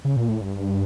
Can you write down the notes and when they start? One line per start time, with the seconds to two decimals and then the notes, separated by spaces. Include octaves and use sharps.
0.05 C#3
0.16 A#2
0.29 A2
0.41 G2